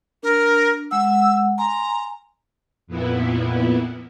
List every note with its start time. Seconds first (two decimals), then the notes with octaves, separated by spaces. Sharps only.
0.23 D4 A#4
0.91 G#3 F#5 E6
1.58 G#5 A#5 C6
2.87 F2 A#2 B3 E4